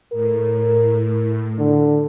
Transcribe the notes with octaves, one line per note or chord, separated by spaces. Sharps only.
A2 A#4
D3